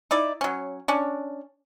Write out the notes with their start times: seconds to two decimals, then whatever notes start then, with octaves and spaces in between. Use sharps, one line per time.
0.11 D#4 E4 D5
0.41 F#3 C#4
0.88 C#4 D4